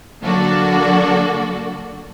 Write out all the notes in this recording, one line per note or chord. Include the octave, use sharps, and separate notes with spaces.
D3 F#3 A#3 D4 F#4 A4